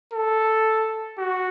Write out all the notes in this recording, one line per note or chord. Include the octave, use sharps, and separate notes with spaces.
A4
F#4